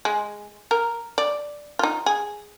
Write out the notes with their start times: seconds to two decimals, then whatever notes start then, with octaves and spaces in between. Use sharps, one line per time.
0.05 G#3
0.71 A#4
1.18 D5
1.79 D#4 F4
2.06 G#4